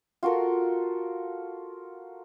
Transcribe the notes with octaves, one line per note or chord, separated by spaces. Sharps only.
F4 F#4 A4 A#4